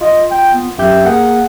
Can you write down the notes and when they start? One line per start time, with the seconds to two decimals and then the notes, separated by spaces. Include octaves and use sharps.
0.01 F4 D#5
0.31 G5
0.54 B3
0.79 F#2 G4 E5 G6
1.05 A#3 G#4 F#5